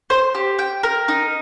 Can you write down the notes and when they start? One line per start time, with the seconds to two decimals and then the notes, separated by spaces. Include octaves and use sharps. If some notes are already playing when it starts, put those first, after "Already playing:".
0.10 C5
0.35 G4
0.59 G5
0.83 A#4
1.08 D#4